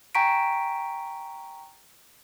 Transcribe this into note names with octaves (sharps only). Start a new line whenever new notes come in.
G5 G#5 A#5 C#6 B6 D7